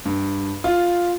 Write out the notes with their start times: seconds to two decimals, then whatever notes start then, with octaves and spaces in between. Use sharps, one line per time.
0.05 G2
0.64 F4